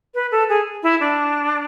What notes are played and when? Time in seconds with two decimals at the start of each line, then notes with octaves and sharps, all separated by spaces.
0.15 B4
0.32 A4
0.49 G#4
0.83 E4
1.01 D4